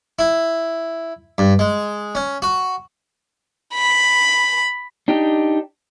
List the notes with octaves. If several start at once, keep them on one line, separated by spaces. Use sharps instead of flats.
E4
G2
G#3
C#4
F#4
B5
D4 D#4 G4 G5